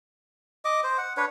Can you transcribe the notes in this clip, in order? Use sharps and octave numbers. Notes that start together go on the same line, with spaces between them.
D#5 D6
C5
F#5
D4 B4 C#5